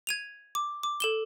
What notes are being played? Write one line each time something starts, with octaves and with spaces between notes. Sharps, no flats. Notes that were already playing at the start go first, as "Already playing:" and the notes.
G#6 D#7 F7
D6
D6
A4 E7 G7